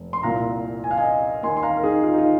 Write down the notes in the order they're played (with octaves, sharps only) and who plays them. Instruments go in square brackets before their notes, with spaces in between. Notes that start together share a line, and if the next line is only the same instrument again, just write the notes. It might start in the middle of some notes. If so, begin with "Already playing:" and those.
Already playing: [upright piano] F1
C6
C2 A#2 F5 A#5
G#5
F5
D#5 G#5
D#2 D#3 G#5 C6
C6
F5 A#5
A#4
D#4 G#4
F4
D#4
F4